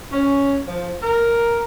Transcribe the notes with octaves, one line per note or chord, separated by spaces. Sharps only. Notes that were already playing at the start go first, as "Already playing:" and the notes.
C#4
F3
A#4